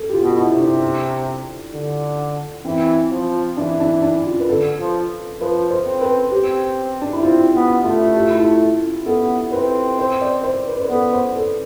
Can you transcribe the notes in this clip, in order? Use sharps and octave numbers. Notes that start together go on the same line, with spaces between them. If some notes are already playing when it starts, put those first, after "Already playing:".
Already playing: A4
G4
F4
B2
E4
C3
D4
D3
E3 C4
F3
E3 D4
D4
D4
F4
B4
D3 A4
F3
F3 B4
C5
C4
B4
C4 G4
D4
E4
C4 F4
B3
A3 F4
G4
F4
E4
F4
B3 A4
C4 B4
C5
D5
C5
B4
C5
B4
B3 A4
C5
A4